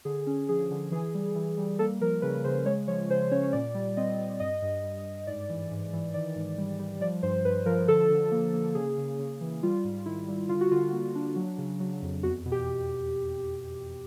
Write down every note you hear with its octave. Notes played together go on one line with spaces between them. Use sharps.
D3 G#4
C#4
F3 G#4
D3
E3 G#4
G3
E3
G3
A#3 A4
F3 A#4
C#3 B4
C#3 C5
G#3 C#5
F3 C#5
C#3 C5
C#4 C#5
A#2 D5
G3
C4 D#5
C4
G2 D#5
G2
G2
G2
G#2 D5
E3
G#2
E3
D#3 D5
G#2
G3
G3
F3 D5
G2 C5
G2 B4
F3 A#4
D3 A4
D3
A#3
A#3
C#3 G#4
C#3
C#3
E3
G3 F4
G#2
D#3 E4
G3
D3 F4
F#4
D3 F4
A#3
D4
F#3
C#3
F#3
F2
E2 F#4
B2
G4